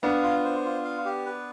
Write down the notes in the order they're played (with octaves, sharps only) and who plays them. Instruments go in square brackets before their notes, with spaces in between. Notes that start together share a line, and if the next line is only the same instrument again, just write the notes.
[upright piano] B3 D4 [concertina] F5
[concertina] F4
C5
F4
F5
G4
B4